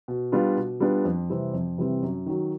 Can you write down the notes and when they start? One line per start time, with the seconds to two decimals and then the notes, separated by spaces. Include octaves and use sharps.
0.08 B2
0.32 G3 B3 D4 F4
0.57 B2
0.80 G3 B3 D4 F4
1.05 F2
1.30 C3 E3 G3 C4
1.54 F2
1.78 C3 E3 G3 C4
2.02 F#2
2.26 D#3 F#3